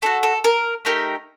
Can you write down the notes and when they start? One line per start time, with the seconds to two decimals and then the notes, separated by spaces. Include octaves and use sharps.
0.02 A3 D4 F#4 A4
0.23 A4
0.44 A#4
0.85 A3 D#4 G4 A#4